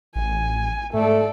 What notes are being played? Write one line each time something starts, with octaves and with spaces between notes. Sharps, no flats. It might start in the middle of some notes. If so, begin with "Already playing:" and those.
A1 G#5
G#2 A3 A4 D5